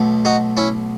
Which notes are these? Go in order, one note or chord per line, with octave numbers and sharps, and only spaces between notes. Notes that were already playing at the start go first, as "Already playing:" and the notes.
Already playing: B1 B2 A3
D#4 F#4
C#4 E4